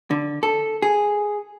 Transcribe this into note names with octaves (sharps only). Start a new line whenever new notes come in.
D3
A4
G#4